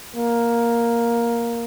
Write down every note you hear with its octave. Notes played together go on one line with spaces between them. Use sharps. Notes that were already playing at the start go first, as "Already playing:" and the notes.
A#3